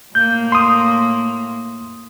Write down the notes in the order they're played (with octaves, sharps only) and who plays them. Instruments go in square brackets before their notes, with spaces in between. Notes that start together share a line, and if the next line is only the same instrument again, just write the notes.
[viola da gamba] A2 A#3 [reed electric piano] G6
[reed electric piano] C6 D#6